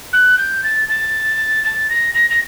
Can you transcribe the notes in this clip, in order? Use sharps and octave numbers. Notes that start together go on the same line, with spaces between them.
F#6
G6
A6
A6
A6
A#6
A#6
A#6